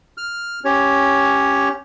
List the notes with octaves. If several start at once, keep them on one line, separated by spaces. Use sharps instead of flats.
F6
C#4 G4 C#5